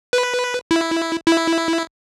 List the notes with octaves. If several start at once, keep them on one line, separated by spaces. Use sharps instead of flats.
B4
E4
E4